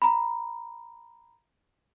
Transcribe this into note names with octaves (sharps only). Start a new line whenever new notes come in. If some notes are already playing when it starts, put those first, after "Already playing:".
A#5 B5